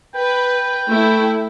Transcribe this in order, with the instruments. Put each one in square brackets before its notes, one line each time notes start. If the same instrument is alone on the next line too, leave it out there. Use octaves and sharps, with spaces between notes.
[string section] B4 [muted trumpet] G5
[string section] A3 E4